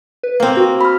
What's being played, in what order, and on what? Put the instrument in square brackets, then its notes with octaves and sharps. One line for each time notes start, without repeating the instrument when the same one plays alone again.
[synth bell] B4
[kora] A#3 C4
[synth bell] F#4
[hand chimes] B5 F6